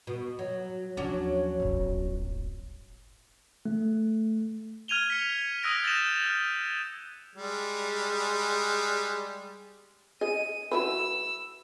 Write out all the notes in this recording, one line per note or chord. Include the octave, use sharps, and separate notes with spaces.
B2
F#3
D#2 F3 F#3 C#4 D4
D1 G1
A3
F6 G#6 D#7 F7 G7
B6 C#7
D#6 E6 F#6 A#6 D7 D#7
G6 A6 A#6 D#7 E7
F6
G3 G#3
G#4 D#5 D#7
F#3 E4 B4 E6